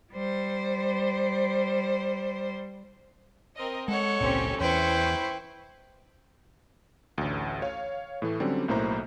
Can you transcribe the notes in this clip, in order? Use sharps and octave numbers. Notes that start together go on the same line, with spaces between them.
G3 C5
C4 A#4 D#5
G#3 A4 C#5 F#5
G#1 C#2 A#2 C4 C#4 G4
E2 E4 B4 C5 G5 C#6
A1 D2
C#5 F5
A2 E3 A3
D3 F#3 G3 C4 C#4
B1 A2 A#3 E4 C5 A#5